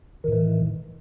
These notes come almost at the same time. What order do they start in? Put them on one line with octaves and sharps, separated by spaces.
D#3 A2 E3